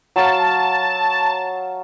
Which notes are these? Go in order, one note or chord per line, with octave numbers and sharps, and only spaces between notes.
F#3 F5 A5